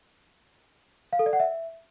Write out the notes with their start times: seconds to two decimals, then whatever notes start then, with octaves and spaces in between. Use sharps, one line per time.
1.13 F5
1.19 A4
1.26 D5
1.33 F#5
1.40 E5